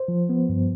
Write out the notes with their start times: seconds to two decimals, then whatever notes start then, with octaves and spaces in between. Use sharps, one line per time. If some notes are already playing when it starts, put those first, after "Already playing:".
Already playing: C5
0.08 F3
0.29 B3
0.49 G2